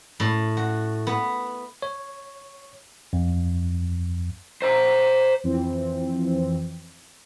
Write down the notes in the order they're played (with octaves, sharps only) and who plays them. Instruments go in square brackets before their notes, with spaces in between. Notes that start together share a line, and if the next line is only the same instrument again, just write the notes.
[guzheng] A2
F#4
B3
[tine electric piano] C#5
F2
[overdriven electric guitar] C5 A#5
[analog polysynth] F2 E3 C4